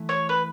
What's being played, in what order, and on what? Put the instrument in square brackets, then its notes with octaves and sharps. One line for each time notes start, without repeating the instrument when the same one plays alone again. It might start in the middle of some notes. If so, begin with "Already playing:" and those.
Already playing: [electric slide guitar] E3 A3 E4
[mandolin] C#5
B4